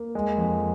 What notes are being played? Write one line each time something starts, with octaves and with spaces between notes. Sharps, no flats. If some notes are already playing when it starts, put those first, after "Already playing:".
Already playing: A#3
G#3
F2